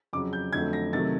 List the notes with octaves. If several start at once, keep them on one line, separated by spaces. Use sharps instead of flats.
F2 C#3 F#3 D6
G6
F2 D3 F#3 A3 G#6
A#6
C3 D#3 F#3 A3 A6